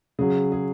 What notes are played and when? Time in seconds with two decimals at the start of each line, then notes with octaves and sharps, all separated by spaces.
0.19 C#3 F#3 G#4
0.52 G#4